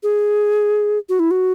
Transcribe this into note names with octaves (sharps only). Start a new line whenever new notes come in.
G#4
F#4
E4
F#4